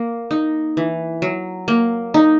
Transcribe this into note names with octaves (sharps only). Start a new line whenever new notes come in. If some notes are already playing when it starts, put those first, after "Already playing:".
Already playing: A#3
D#4
E3
F#3
A#3
D#4